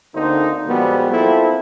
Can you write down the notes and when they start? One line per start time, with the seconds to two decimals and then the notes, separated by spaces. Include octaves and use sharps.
0.15 D2 D3 A#3 C4 D#4 C5
0.67 A#2 F3 G3 G#3 B3 F#4
1.12 A#3 C4 E4 F4 A4